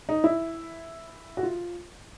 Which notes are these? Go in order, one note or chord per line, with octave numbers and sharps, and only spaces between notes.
D#4
E4
F#4
F4